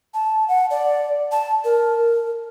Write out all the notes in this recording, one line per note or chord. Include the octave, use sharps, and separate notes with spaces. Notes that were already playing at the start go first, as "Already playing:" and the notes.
A5
F#5
D5
A5
A#4